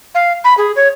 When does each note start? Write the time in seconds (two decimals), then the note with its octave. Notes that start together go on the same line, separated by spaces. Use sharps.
0.15 F5
0.44 B5
0.58 G#4
0.76 C#5